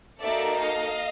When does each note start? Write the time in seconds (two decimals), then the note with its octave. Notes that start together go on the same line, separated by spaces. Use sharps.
0.20 A#3 D#4 F#4 A4 D5 E5
0.61 D#5 F5